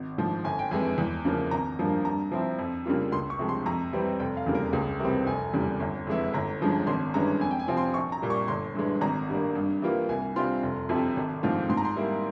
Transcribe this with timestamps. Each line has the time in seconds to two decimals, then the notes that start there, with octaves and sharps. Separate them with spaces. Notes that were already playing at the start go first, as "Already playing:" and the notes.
Already playing: G#1
0.18 G#2 F3
0.44 G1 G#5
0.59 G5
0.71 F2 E3 G#3 G#5
0.98 E2
1.25 C#3 F3 A#3
1.51 G#1 A#5
1.79 G2 F3 A#3
2.05 G2 A#5
2.32 F3 C4 E4
2.59 F2
2.86 C#3 G3 A#3 F4
3.12 C#2 C6
3.30 C#6
3.39 C3 F3 G#3
3.49 C6
3.66 F2 A#5
3.93 E3 G3 C4
4.20 F1 G5
4.37 F5
4.46 E2 C#3 G3 A#3
4.55 A#4
4.73 C#2 G#4
5.00 C3 E3 G3 C4 A#4
5.26 F1 G#5
5.54 E2 C#3 G3
5.80 G1
6.07 F2 E3 G#3 E4
6.34 G1 A#5
6.61 G2 F3 G#3 C#4
6.87 G#1 C6
7.14 G2 E3 G#3 C#4 A#5
7.41 F2 G#5
7.51 G5
7.59 G#5
7.68 C3 F3 C4 F4
7.77 C6
7.94 A#1 C#6
8.12 A#5
8.22 A#2 G3 A#3
8.30 C#6
8.48 G1 C6
8.75 G2 E3 G#3
9.01 G#1 A#5
9.28 G2 G3 A#3
9.55 G2
9.82 E3 G3 A#3 F4
10.09 C2 G#5
10.36 C3 G3 C4 F4 C6
10.63 F1
10.89 F2 C3 F3
11.17 G#1
11.43 G#2 F3 C4 F4
11.69 G#2 C6
11.77 A#5
11.85 C6
11.96 G3 A#3 E4